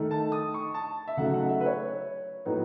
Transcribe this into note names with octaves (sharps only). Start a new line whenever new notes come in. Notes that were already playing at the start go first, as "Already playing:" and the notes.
Already playing: D#3 A3 D#4
A5
D#6
C#6
A5
E5
C#3 F#3 A3 D#4 F#5
F#5
E5
B4
C#5
A2 F#3 B3 D#4